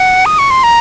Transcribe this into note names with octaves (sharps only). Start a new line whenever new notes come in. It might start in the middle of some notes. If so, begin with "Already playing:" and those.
Already playing: F#5
D#6
C#6
C6
A#5